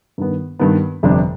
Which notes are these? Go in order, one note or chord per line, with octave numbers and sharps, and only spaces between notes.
G2 D#3 B3
G2 D#3 B3
G1 F2 C3 G3 D4